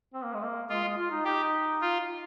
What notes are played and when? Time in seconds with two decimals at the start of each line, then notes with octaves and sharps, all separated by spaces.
0.14 C4
0.24 A#3
0.34 G#3
0.43 A#3
0.69 G#3 F4
0.84 G#3
0.97 F4
1.11 D#4
1.25 D#4 G4
1.81 F4